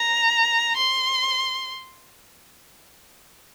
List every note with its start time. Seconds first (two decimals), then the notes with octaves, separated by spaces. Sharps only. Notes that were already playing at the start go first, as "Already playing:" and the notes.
Already playing: A#5
0.77 C6